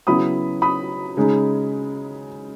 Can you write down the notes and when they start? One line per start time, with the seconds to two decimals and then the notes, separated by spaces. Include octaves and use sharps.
0.07 C#3 F#3 B3 E4 B5 D#6
0.62 B5 D#6
1.17 C#3 G#3 D#4